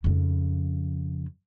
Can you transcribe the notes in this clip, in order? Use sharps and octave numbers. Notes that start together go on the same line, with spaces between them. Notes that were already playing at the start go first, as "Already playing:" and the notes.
F2 C#3